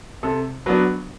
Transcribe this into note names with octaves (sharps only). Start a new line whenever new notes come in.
C3 A4
F#3 B3 D4 B4